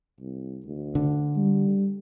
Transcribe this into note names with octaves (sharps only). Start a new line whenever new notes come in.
C2
D2
D3
G3